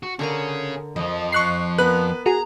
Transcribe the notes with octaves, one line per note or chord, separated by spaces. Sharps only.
F#4
D3 C#4 G#4 A#4 A#5
F2 F3 D#5
C#6 F#6 C7
B3 A#4 B4 F#6
F#4 G#4 A#5